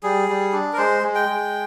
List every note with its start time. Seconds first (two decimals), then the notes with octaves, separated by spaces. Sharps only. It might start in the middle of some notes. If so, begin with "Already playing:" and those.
0.03 G3 G#4
0.29 G3
0.52 D4
0.73 A#4
0.77 G#3 C5
1.03 G#3
1.15 G5
1.28 G#3